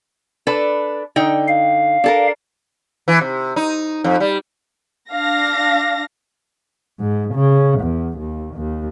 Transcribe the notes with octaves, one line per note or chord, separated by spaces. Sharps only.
D4 A4 B4
D3 D#4 G5
F5
D4 A4 A#4
E3
C3
D#4
F2
G3
D4 F5 A#6
G#2
C#3
E2
D#2
D#2